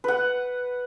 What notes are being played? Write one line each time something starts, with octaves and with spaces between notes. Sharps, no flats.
B4 F#5